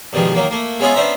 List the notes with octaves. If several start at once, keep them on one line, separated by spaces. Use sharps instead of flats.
G2 B2 D#3 F3 G#3
D#3 F#3 A#3
A3 A#3
G#3 B3 C#4 E4 F4 G#4
B3 C#4 D4 C5 E5 A#5